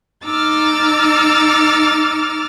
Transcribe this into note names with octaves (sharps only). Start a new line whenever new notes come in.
D#4 D6 E6 F6 A6